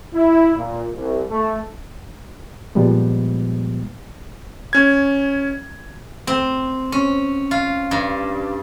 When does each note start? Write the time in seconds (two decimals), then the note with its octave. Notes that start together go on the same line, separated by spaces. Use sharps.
0.14 E4
0.56 A#2
0.94 C2
1.30 A3
2.75 A#2 F3 G3 G#3 B3
4.73 C#4 G#6
6.27 C4
6.92 C#4
7.51 F4
7.91 G2